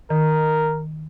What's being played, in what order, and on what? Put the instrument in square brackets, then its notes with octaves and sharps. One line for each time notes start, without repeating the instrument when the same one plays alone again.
[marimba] D#3 [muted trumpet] A#4